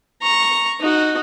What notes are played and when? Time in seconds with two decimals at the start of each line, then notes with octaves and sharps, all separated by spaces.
0.22 A#5 C#6
0.80 D#4 F#4